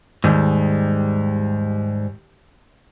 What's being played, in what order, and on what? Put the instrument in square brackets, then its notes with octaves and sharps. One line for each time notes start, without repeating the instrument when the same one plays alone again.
[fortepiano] D#2 [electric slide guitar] G#2 G3